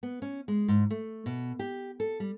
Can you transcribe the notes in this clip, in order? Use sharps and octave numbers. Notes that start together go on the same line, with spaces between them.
B3
C#4
G#3
G#2
A3
B2
G4
A4
G3